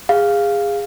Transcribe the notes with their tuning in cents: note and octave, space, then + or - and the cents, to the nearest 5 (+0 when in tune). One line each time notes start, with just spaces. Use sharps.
G#4 -25 F5 +0